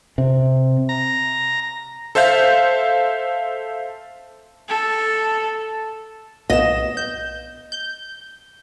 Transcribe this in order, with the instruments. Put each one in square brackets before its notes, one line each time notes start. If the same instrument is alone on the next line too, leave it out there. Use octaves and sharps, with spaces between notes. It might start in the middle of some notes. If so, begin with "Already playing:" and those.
[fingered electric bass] C3
[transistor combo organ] A#5
[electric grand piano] A4 C5 E5 F5 G6
[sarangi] A4
[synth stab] B1 B3 E7 [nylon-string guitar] D#5
[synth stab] G6
G6